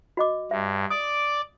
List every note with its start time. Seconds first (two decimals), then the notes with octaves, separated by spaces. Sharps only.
0.17 F#4 D#5 D6
0.51 G2 E5
0.90 D5 D6 D#6